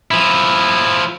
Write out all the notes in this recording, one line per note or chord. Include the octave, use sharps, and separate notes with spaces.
F3 E4